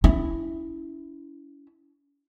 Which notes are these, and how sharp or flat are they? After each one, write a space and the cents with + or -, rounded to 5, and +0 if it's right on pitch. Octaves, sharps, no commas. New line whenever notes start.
C#4 +40 E4 +0